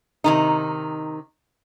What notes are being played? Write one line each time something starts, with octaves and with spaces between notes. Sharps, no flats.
C3 D#3 D#4